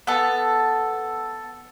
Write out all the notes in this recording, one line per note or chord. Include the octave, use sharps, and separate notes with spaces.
B3 A4